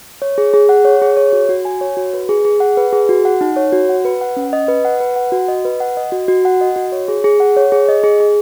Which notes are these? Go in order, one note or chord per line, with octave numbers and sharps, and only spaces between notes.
C#5
G#4
G#4
F#5
C#5
G#4
C#5
F#4
F#4
G#5
C#5
F#4
B4
G#4
G#4
F#5
B4
G#4
F#4
F#5
D#4
C#5
F#4
F#5
B4
F#5
C#4
D#5
B4
F#5
B4
F#5
F#4
D#5
B4
F#5
D#5
F#4
F#4
F#5
D#5
F#4
C#5
G#4
G#4
F#5
C#5
G#4
D#5
G#4
G#4